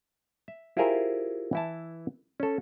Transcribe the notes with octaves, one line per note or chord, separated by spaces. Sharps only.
E5
E4 F4 G4 G#4 A#4 C5
E3 E4 A5
C#4 A4